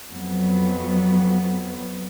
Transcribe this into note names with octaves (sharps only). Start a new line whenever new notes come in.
F2 F#3 B3